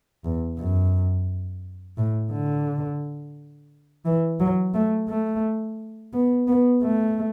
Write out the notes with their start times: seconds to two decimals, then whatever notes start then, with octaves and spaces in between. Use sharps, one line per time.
0.24 E2
0.58 F#2
1.98 A2
2.32 D3
4.05 E3
4.40 F#3
4.74 A3
5.09 A3
6.13 B3
6.48 B3
6.82 A3